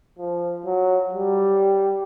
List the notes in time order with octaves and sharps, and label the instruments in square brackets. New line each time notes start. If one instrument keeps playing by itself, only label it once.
[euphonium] F3
F#3
G3